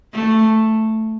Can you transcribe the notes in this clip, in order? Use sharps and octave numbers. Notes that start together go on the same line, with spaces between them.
A3